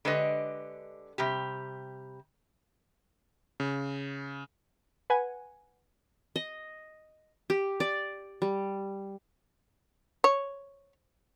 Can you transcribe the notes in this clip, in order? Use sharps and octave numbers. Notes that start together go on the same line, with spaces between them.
D3 G#3 G4 B4 D#5
C3 G3 G4
C#3
B4 F#5 G#5
D#5
G4
D5
G3
C#5